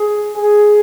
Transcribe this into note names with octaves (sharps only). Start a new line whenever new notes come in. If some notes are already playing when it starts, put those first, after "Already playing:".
Already playing: G#4
G#4